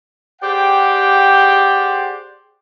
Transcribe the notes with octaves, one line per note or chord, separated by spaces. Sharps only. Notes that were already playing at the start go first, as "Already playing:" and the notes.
G4 G#4 C5 D5 F#5 G5